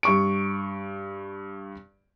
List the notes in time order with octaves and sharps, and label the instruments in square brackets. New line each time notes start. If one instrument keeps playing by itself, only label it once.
[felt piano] G2 C#6 D7